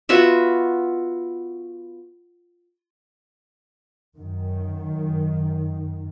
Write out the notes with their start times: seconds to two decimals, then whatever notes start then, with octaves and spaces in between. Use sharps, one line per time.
0.09 B3 F4 F#4 E5
4.18 F#2 D#3